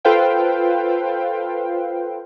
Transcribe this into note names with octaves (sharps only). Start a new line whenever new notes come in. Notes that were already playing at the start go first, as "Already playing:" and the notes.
F4 A4 B4 C5 F5 G5